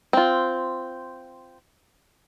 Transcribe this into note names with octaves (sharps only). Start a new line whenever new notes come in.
C4 F4